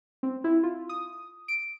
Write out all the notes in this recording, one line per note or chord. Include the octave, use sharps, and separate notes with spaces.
C4
E4
F4
D#6
D7